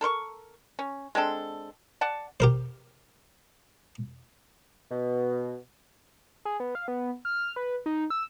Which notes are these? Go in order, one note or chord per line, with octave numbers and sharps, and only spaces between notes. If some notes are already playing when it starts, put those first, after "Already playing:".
A4 A#4 C6 C#6
C#4
G#3 C4 D4 A4
D5 F#5 A5
G4 A#4 C5
B2
G#4
B3
F5
B3
F6
B4
D#4
E6